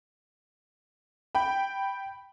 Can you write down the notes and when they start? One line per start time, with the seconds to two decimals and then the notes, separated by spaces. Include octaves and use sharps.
1.35 G5 B5